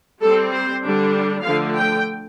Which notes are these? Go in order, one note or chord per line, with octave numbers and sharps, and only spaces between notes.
G3 C4 A4
C5
D3 G3 D4
D3 F3 A3 F5
G5